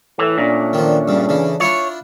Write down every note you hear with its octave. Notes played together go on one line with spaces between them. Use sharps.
A2 E3
A#2 A3 C#4 D4
D#3 F3
G2 C#3
C#3 E3
D4 E4 F4 C#5